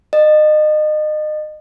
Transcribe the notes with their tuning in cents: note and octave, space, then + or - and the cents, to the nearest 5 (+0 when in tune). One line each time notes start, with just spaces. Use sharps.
D#5 -30